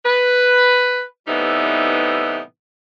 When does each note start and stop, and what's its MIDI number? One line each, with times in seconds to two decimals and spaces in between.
0.05 1.01 71
1.28 2.40 45
1.28 2.40 48
1.28 2.40 52
1.28 2.40 55
1.28 2.40 59
1.28 2.40 63